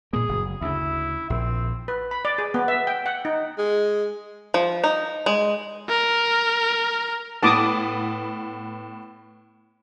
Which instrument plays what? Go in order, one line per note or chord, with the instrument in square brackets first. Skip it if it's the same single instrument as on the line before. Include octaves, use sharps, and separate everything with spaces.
[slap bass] G2 A#2 A#3 [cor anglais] G#4
[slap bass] F#1
[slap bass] D2 C#3 [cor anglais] E4
[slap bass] A#1 [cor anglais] C4
[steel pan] B4
B5
D5
G#4
B3
E5
G5
F#5
D#4
[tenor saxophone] G#3
[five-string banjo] F3
D#4
G#3
[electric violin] A#4
[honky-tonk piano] A2 B3 [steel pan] A5 D6 D#6